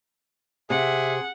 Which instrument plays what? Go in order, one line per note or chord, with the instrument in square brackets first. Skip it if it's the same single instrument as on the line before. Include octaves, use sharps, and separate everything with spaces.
[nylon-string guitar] C3 [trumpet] G#4 [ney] E5 [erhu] F#5